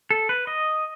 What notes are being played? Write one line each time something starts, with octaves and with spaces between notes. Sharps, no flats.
A4
B4
D#5